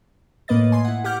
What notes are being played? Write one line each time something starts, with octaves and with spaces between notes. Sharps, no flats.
A2 A#3 B4 D#5 A6
G#5 C6
E4 F#5
G4 F#5 D6 F6 G6